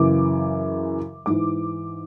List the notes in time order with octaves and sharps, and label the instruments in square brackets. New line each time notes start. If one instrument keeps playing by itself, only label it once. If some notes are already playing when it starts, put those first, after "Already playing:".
Already playing: [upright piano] F#2 C#3 E3 D6
G#2 E3 D6